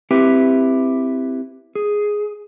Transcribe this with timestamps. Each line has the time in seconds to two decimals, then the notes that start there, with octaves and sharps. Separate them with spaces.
0.11 C4 E4 G4 B4
1.75 G#4